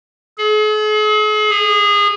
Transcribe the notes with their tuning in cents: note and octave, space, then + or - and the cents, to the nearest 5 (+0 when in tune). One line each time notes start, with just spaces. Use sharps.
G#4 +45
G#4 -25